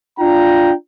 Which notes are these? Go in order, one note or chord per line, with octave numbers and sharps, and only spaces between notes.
D4 F4 G5 A#5